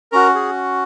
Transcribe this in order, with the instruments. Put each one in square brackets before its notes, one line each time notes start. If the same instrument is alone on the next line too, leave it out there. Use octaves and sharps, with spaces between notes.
[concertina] C#4 F#4 A#4
G#4